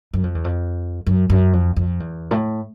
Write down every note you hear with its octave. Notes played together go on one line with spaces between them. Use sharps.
F#2
F2
E2
F2
F#2
F#2
F2
F2
E2
A2